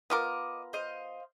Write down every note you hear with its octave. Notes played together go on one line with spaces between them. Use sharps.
B3 F4 A#4 D#5 D6
C5 D#5 F5